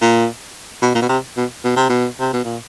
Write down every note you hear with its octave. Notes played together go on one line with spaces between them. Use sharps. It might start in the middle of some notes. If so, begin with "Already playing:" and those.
A#2
B2
A#2
B2
C3
B2
B2
C3
B2
C3
B2
A#2